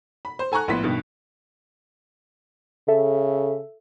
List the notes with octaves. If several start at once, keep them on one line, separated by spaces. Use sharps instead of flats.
B5
C5
A4 G#5 A#5 C#6 F#6
A#1 A2 B3 C6 B6
G2 B2 D#3
C#3 A4 E5